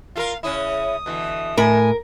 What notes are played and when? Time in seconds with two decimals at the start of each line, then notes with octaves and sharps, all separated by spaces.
0.16 F4 A4 A#4 F5
0.43 C#3 C#4 E4 D#6
1.06 B2 D3 E3
1.57 A2 A#4 G#5 B5